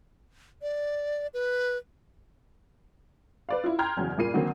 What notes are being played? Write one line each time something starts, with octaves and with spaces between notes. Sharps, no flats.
D5
B4
B4 D5 F5
E4 F4
G5 A#5 C6 F6 G6 G#6
F#1 E2 F#3
G2 A#2 A#3 F4 C7 D#7
D3 D#3 F#3 A#3 C4